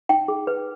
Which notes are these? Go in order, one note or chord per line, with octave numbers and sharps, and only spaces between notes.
D#4 G5
G#4
B4